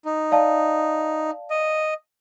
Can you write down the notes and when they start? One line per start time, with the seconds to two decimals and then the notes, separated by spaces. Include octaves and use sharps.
0.05 D#4
0.32 D5 F5 A5
1.50 D#5